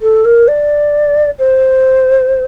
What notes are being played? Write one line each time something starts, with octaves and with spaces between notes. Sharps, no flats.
A4
A#4
D5
C5